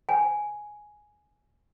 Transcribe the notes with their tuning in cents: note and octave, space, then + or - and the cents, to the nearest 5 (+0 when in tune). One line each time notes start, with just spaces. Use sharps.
G#5 +5